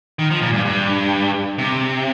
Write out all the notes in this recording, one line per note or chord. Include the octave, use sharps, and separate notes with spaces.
D#3
F3
A#2
G2
G2
C3